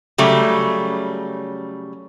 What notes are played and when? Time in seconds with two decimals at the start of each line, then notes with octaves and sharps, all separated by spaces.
0.18 C#3 F#3 G3 A3